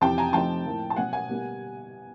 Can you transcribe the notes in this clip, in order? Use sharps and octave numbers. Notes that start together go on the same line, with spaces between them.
F2 C3 E3 G5 A5
G#5 A#5
C3 F3 A3 C4 D#4 G5 A5
A2 F3 A#3
A5
B2 F#3 B3 F#5 G#5
F#5 G#5
B2 G3 A#3